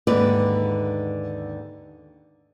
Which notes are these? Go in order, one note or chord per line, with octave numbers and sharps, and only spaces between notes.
D#2 G#2 D3 B4 D5